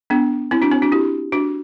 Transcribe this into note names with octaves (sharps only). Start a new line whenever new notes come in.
B3 D4
C4 E4
D4 F#4
C4
D4 F#4
E4 G4
D4 F#4